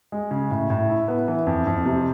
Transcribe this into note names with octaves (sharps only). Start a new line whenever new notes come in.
G#3
C#3
A2
A2
E4
B3
E3
F2
F2
C3